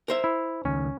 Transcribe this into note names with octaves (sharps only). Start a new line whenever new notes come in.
A#4 C5 E5
E4
C#2 D#3 C#4